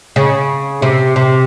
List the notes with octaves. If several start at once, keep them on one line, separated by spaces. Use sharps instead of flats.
C#3
C3
C3